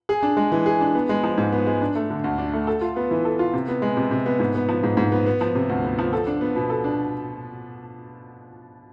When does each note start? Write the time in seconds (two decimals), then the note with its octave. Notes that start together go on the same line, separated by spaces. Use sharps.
0.09 G#4
0.23 D4
0.37 G#3
0.52 E3
0.66 G#4
0.80 D4
0.95 B3
1.09 G#3
1.24 F3
1.38 G#2
1.52 B3
1.66 G#3
1.81 D4
1.95 A3
2.10 D3
2.24 D2
2.38 D4
2.53 A3
2.67 A4
2.81 F4
2.96 B3
3.11 E3
3.25 A4
3.39 F4
3.53 C3
3.68 B3
3.82 G#3
3.97 C3
4.11 C3
4.26 B3
4.40 G#2
4.55 B3
4.69 F3
4.83 G#2
4.97 G#2
5.12 B3
5.26 B3
5.41 F3
5.55 C3
5.69 D2
5.84 B3
5.99 F3
6.13 A4
6.27 D4
6.41 B3
6.56 B2
6.70 A4
6.84 D4